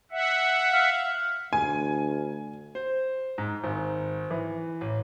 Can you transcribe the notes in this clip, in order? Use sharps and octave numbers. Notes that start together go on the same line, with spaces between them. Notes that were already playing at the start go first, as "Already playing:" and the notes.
E5 F#5
F5
D2 G#5
C5
G#2
G#1
E3
A1